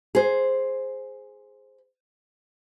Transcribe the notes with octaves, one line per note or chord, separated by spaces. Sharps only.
G#4 C5